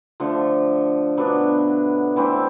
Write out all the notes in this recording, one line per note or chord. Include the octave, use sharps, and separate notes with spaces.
D3 F3 A3
B2 F#3 B3 D4
E3 A3 C4 E4